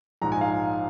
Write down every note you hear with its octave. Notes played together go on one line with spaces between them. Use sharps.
A#1 G#2 F3 A#5
G#5
F5